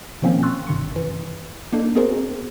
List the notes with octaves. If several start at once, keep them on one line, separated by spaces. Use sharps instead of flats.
B2 D#3 F3 A#3 C4 C#4
C6 C#6 E6 F#6 A6
G#1 G2 C3 D#3 C6 C#7
F#2 E3
A#3 D4 D#4 A4
B3 C4 F#4 G#4 A#4 C5